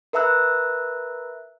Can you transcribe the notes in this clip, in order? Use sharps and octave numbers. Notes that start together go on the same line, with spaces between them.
A#4 B4 E5 A#5 E6 F#6